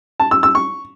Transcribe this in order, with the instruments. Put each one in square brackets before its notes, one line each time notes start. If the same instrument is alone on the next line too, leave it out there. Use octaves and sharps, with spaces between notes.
[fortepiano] A5
E6
E6
C#6